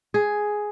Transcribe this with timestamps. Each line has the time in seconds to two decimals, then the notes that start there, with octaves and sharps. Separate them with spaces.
0.14 G#4